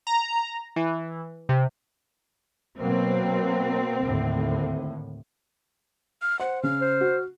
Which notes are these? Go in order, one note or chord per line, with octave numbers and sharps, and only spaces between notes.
A#5
E3
C3
B2 F#3 A#3 C4
D#2 A2 D3
F6
C5 F#5
C#3 F6
C5
F#4